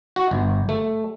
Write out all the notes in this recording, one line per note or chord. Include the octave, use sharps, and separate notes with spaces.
F#4
G1
A3